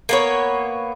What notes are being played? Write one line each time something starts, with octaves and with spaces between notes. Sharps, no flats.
A#3 B3 C#5